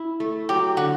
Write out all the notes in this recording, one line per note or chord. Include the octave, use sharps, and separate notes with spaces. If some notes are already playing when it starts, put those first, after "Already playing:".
Already playing: E4
A3
F#3 G4
D3 F#4